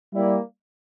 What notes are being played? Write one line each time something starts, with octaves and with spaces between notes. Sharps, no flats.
G3 A#3 E4 G4 D5